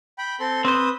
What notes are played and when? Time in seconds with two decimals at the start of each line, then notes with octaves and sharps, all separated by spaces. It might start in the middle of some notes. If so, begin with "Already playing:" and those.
0.18 G5 B5
0.40 C4 A4 C6
0.65 C4 B4 C5 D#6